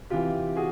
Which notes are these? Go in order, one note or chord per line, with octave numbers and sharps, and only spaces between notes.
C3 E3 F4 G4
F#4 G#4